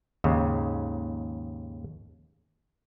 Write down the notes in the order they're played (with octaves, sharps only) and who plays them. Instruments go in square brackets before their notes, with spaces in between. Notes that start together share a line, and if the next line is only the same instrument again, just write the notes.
[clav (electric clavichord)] D#2 G#2 C#3